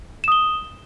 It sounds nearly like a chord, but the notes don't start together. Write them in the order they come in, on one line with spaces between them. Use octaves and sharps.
E7 D#6 G7